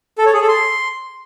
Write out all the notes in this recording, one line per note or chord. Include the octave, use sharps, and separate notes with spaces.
A4
C#5
G#4
A4
C6